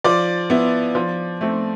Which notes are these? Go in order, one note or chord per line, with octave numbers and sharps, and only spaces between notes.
F3 D5 D6
B3 E4
F3
A3 C4